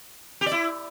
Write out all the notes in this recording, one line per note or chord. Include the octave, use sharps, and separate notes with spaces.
G4
D5
E4